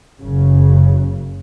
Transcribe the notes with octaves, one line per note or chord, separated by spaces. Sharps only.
F#1 F#2 C#3